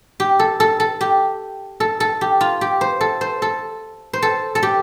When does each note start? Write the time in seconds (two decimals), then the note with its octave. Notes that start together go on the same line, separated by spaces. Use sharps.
0.20 G4
0.39 A4
0.60 A4
0.80 A4
1.01 G4
1.80 A4
2.00 A4
2.21 G4
2.41 F4
2.61 G4
2.81 C5
3.01 A4
3.21 C5
3.42 A4
4.13 C5
4.22 A4
4.55 A4
4.63 G4